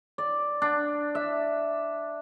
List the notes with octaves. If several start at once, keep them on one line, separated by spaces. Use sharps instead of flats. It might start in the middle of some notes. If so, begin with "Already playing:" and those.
D5
D4
E5